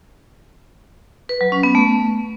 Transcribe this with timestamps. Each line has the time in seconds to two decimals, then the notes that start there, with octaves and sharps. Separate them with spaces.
1.29 B4
1.41 F#3
1.52 C#4
1.63 B3
1.75 A3